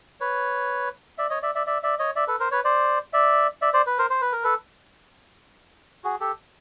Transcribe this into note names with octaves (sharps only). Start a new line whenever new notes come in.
B4 C#5
D5 E5
C#5 D#5
D5 E5
D5 E5
D5 E5
D5 E5
C#5 D#5
D5 E5
A4 B4
A#4 C5
B4 C#5
C5 D5
D5 E5
D5 E5
C5 D5
B4
A#4 C5
C5
B4
A#4
A4 B4
F#4 G#4
G4 A4